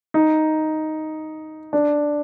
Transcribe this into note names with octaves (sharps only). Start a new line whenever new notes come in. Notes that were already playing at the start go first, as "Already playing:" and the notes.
D#4
D4